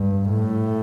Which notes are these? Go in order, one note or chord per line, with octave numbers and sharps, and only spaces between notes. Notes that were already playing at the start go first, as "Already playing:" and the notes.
Already playing: G2
A2